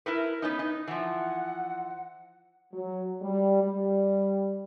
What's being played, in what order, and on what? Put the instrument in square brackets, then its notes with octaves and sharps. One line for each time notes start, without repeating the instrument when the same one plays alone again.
[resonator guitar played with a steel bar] E4 A#4 B4
B3 C#4 D#4
[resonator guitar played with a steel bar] D#4 [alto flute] B4
[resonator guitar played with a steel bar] E3 F3 [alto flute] F#5
[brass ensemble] F#3
G3
G3